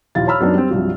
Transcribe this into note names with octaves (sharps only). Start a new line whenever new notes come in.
D#2 A#2 F3 E4 F5 A6
C#5 F5 A#5 B5 E6 F6
F#2 F#3 B3 D4 D#4
G3 C4
C2 G2 F3 F#3